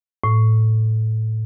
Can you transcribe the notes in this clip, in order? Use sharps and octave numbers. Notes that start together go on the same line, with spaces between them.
A2